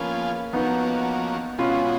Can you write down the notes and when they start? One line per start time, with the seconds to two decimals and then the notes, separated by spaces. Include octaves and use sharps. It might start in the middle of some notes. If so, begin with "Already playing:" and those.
Already playing: F3 A#3 B3 C#4 F4 G#4
0.52 F3 A#3 B3 C#4 D#4 F#4
1.58 B2 G#3 B3 C#4 F4 F#4